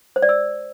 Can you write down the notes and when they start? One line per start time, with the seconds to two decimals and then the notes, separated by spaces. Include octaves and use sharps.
0.16 C5
0.22 D5
0.29 E6